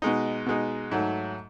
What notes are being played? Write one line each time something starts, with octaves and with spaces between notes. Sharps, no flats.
B2 G#3 D#4
B2 G#3 D#4
G#2 F#3 A3